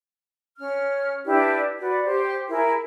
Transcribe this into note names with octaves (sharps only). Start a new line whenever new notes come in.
C#4 F6
D4 E4 G4 B4
F#4 B4 D5
G4 C5
E4 G#4 A#4